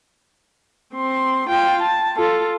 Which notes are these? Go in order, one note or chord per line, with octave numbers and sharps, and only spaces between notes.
C4 C6
F4 G5
A5
F4 A4